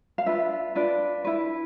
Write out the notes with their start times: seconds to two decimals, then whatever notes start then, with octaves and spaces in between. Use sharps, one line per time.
0.18 F5
0.26 D4 F4 B4 E5
0.75 D4 F4 B4 D5
1.25 E4 B4